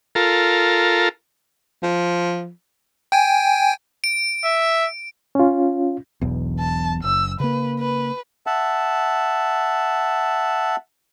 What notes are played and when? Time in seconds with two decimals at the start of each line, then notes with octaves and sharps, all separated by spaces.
0.15 F4 A4 A#4
1.83 F3
3.12 G5 G#5
4.04 D7
4.45 E5
5.35 C#4 F4
6.22 E1 B1 E2
6.60 A5
7.04 F#1 E6
7.40 C#3 A#3 B4
7.79 B4
8.46 E5 F#5 A5